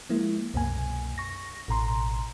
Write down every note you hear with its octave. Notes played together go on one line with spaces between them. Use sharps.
F3 G#3 A#3 E4
C2 F#2 B2 A#3 G#5
C#6 A#6
A1 B2 A#5 C6